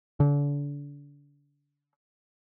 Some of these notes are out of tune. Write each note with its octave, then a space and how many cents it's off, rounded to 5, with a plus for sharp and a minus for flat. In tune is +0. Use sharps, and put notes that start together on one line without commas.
D3 -35